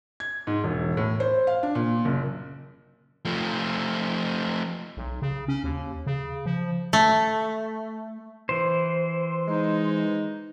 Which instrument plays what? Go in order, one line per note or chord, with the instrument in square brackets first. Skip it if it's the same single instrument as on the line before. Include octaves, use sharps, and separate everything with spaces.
[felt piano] G#6
G#2
E1
A2
C5
F5
D4
A#2
F#1
[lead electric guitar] F3 A3
[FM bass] B1
C#3
C#4
D#2
C#3
F3
[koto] A3
[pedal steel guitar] E3 C5
[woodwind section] G#3 D#4